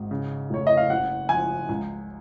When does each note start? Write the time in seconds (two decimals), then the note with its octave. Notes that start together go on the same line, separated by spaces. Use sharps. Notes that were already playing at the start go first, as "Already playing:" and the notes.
Already playing: G#1 G#2
0.11 C#3
0.50 F1 C#5
0.67 D#5
0.77 F5
0.90 F#1 F#5
1.29 F3 G#5
1.69 C#2